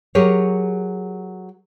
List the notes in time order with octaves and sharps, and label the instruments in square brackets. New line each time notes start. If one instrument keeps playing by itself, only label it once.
[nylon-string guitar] F#3 G4 G#4 A#4 C#5